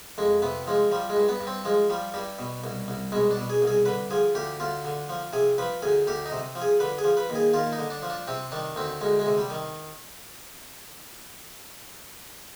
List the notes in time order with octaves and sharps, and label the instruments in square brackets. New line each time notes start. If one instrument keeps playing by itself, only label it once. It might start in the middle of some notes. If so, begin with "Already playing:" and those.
[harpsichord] F2 G#3
C3 B3
F3 G#3
F3 G3
G#3
G2
B3
G2
C4
F3 G#3
F3 G3
G2 G3
B2
C2
C2
B2 G#3
D4
B2
G#4
C2
G#4
D3 B4
F3 G#4
D2 G4
D2 F4
D3
F3
C3 G#4
F3 B4
D2 G#4
D2 G4
D#4
C3
F3
G#4
D3 B4
G#4
F3
B4
D#2
G#4
D#2 F4
D#4
D3
D4
F3
D4
C3 C4
D#3 D4
D2 C4
D2 G#3
G#3
C3
G3
D#3